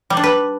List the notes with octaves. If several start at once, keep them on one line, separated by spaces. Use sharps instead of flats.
G3
D4
B4